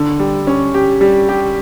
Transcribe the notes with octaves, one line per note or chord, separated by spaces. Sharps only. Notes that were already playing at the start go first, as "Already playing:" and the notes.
Already playing: D3
G3
C#4
G4
G3
G4